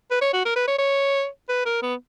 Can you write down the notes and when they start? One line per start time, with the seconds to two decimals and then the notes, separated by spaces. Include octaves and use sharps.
0.11 B4
0.21 C#5
0.33 F#4
0.45 A#4
0.56 B4
0.68 C#5
0.79 C#5
1.49 B4
1.65 A#4
1.82 B3